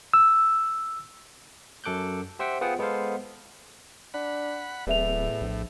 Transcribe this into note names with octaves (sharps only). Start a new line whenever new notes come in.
E6
F#2 A4 D6 F#6 G6
G4 C5 E5 F#5 G5
B3 F4 G#4 C5 F#5 G5
G#3 B3 A4 C5 F5
D4 F#5 B5
D1 E2 A2 D5 E5 F7
A#1